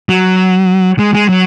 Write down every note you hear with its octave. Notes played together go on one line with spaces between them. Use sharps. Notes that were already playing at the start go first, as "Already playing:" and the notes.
F#3
G#3
G#3
F#3